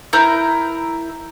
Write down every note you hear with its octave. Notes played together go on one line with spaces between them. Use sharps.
E4 A#4 G6